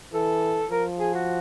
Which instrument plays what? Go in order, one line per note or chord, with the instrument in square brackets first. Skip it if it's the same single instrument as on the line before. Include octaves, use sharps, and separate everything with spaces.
[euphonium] E3 [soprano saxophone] A4
[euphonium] F3 [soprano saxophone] A#4
[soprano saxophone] G#4
F#4